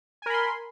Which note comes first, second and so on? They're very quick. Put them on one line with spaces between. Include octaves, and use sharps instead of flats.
G#5 A#4 B5 C6